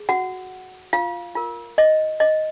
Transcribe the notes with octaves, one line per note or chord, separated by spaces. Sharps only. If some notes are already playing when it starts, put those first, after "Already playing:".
Already playing: G#4
F#4 F#5
F4 F5
F4 A#4
D#5
D#5